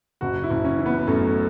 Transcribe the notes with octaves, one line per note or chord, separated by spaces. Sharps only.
F#1 F#4
E4
F#1
C#4
E3
B3
F#2 A3